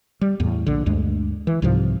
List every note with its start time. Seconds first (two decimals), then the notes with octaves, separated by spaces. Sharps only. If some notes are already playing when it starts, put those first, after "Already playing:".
0.21 G3
0.40 E2 A2
0.66 A#1 D3
0.86 D2 G2 G#3
1.47 E3
1.62 C2 G#2 C3 F3